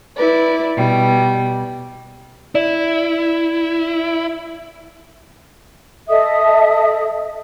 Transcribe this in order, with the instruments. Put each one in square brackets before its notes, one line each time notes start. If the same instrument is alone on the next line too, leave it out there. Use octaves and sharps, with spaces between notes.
[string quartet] E4 B4 D5
B2 G3
[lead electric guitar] E4 [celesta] D5
[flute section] A4 D#5 E5 D#6